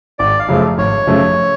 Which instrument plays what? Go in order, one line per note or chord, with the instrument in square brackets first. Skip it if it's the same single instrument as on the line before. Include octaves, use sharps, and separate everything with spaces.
[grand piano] G#1 [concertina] D5
[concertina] F5
[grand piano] F#2 C#3 F3 A3
[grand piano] G#1 [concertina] C#5
[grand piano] F#2 C#3 F3 A3